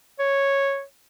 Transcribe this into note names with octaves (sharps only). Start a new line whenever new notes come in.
C#5